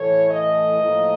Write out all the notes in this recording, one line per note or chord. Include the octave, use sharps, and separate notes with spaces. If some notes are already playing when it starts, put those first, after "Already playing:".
Already playing: A2 E3 A3 C#5
D#5
A2 F3 A#3